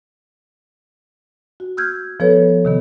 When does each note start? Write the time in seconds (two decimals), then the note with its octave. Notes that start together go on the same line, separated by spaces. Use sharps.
1.60 F#4
1.77 E6 F6 G6 G#6
2.20 F3 B3 A4 B4 C#5
2.65 C3 D#3 B3